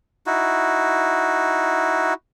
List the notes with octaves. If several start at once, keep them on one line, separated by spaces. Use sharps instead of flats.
D#4 E4 F#4